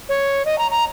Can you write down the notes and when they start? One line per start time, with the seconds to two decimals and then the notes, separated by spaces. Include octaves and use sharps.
0.09 C#5
0.45 D#5
0.58 A#5
0.71 A#5